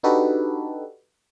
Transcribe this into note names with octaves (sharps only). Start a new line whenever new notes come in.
D4 D#4 F#4 G4 A4 B4